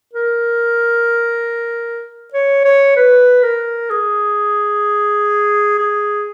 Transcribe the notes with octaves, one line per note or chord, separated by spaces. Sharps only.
A#4
C#5
C#5
B4
A#4
G#4
G#4